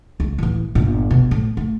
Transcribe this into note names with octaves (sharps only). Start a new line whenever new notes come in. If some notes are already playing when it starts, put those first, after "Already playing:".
C#2
A1 E3
G1 A#2
B2
A2
A3